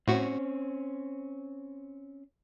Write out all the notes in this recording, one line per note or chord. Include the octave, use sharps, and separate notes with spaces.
A2 C4 C#4 F#4